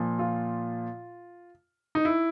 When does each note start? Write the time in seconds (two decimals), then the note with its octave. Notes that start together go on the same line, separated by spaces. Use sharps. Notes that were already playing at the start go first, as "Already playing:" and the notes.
Already playing: A#2 F3
0.19 F4
1.95 D#4
2.05 E4